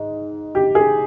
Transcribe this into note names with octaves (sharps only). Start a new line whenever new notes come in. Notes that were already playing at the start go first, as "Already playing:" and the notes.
Already playing: G#2 D#4
G4
G#4